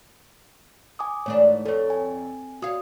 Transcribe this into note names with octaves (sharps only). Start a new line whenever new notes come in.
G#5 D6 D#6
G#2 E3 A3 D4 C#5
F2 A4 C#5
G#5
F#4 C#5 F5 D#6